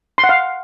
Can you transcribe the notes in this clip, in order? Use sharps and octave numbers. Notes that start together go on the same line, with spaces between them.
C6
F#5
F5